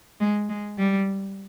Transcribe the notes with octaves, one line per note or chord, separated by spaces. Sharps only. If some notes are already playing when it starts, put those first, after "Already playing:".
G#3
G#3
G3